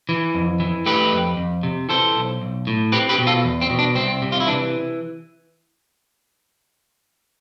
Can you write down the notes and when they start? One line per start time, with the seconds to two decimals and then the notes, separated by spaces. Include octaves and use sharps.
0.09 E3
0.35 F2
0.60 E3
0.86 A3 G4 B4
1.12 F2
1.37 F2
1.63 C3
1.89 E3 A4 C5
2.15 B1
2.42 B1
2.67 A2
2.92 C4 G4 B4
3.09 G4 B4
3.19 B2
3.27 F4 A4
3.44 E2
3.61 C4
3.70 B2
3.79 D4
3.95 C2 C4
4.22 C3
4.32 F4
4.40 E4
4.47 E3 D4